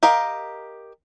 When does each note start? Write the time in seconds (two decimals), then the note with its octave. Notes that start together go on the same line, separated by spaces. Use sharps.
0.03 G4 A#4 D#5 F5